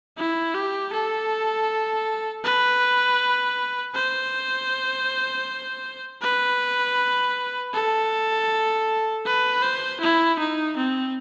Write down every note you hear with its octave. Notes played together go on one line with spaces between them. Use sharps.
E4
G4
A4
B4
C5
B4
A4
B4
C5
E4
D#4
C4